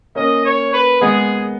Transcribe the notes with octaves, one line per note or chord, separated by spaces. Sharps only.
A#3 C#4 D#5
C#5
B4
G#3 B3 G#4